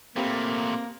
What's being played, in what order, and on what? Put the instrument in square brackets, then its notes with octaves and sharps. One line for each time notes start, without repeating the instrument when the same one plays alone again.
[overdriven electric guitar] A#2 A3 [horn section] A#3 [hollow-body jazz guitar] C4 G4 B4